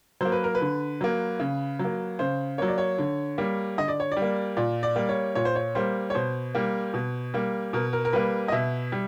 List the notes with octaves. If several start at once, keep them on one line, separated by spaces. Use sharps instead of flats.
F#3 A#3 C5
B4
A#4
B4
D3
F#3 A#3
C#3
F#3
A#3
C#3 C5
F#3 A#3 C#5
D5
C#5
D3
G3 A#3
D3 D#5
D5
C#5
D5
G3
A#3
A#2 D5
D5
G3 A#3
C#5
A#2 C#5
C5
C#5
G3 A#3 C5
C#5
B2 C5
G3 A#3
B2
G3 A#3
B2 A#4
A#4
A#4
G3 A#3 B4
D#5
B2 E5
G3